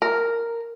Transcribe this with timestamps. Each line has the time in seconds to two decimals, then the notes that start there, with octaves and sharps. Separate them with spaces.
0.02 A#4